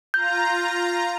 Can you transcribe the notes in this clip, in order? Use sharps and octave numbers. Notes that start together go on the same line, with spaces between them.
F4 A#5 G6